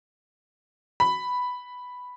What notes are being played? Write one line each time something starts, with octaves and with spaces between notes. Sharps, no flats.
B5